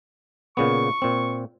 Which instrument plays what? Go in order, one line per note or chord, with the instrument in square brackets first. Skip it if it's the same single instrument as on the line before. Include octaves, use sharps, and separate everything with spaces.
[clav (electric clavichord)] A#2 C#3 B3 [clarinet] C#6
[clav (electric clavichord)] A#2 C4